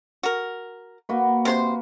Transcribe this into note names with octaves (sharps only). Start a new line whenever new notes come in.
F#4 A#4
A#3 F#4 B4
C3 C5 C6